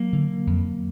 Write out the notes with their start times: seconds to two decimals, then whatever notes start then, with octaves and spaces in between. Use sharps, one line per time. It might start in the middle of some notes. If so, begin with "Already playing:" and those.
Already playing: F#3 A#3
0.13 D3
0.47 F2